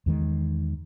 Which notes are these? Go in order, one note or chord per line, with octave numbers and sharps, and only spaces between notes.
E2 D#3 G#3